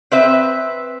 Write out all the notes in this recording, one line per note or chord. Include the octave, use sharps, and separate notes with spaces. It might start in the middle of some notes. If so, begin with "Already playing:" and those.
C4 B4 E5